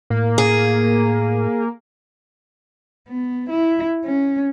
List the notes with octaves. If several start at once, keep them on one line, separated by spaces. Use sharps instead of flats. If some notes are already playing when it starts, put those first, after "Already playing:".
A2 A#3
G#4
B3
E4
C#4